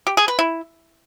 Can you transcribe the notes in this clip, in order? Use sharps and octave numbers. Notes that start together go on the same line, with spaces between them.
G4
G#4
B4
E4